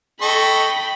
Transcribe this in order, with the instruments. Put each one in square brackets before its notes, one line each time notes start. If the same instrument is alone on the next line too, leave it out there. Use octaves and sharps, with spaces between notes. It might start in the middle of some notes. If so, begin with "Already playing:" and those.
[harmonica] A4 D#5 C#6 [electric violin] G5 B5